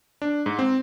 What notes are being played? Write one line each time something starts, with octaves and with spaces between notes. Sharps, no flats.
D4
G#2
C4